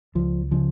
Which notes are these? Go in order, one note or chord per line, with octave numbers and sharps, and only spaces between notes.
C#2 F3
C#3 F3